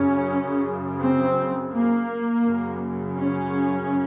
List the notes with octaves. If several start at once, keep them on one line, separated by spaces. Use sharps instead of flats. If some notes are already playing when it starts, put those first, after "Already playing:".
Already playing: F#2 C#3 C#4
C4
A#3
F#2 C#3
C#4